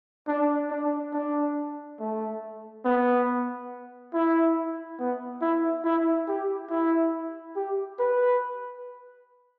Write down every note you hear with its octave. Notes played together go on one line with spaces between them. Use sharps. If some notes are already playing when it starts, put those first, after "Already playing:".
D4
D4
D4
A3
B3
E4
B3
E4
E4
G4
E4
G4
B4